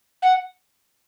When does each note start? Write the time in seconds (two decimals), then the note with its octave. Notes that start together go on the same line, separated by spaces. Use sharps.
0.22 F#5